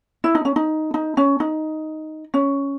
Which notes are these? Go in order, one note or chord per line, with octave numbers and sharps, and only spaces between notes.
E4
D#4
C#4
D#4
D#4
C#4
D#4
C#4